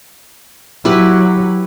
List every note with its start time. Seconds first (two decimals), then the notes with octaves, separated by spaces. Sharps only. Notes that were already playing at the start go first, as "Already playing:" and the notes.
0.85 F#3 E4 G4 B4